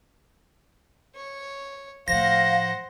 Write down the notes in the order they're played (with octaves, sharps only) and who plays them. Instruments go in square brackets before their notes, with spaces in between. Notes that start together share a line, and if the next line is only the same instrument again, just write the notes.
[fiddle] C#5
[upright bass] A2 F3 [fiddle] C5 F#5 [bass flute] F5 [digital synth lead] A#6